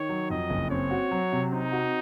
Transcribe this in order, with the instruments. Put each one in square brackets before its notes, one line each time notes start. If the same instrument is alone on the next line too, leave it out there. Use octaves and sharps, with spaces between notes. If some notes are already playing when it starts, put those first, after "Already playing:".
Already playing: [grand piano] D#3 [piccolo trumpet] C#5
[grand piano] F#3
[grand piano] F2 [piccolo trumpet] D#5
[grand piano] F#1
[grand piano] C4 [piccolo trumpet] C#5
[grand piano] F#4
F#3
C3
[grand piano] C4 [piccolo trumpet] D#4
[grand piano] F#4